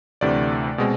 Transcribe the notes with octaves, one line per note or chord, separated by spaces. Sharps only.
D2 C3 E3 A3 D4 D5
B2 G#3 C4